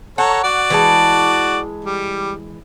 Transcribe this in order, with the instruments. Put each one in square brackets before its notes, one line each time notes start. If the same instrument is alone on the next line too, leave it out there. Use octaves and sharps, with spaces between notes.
[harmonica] A4 C#5 A#5 [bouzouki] F#5
[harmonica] F#4 D5
[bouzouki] E3 G#3 A5
[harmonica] G3